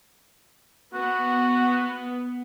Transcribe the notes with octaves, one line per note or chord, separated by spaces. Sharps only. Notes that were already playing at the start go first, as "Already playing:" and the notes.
B3 F#4